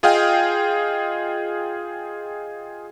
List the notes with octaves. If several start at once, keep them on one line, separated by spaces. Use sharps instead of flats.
F4 G#4 D#5 F5 G5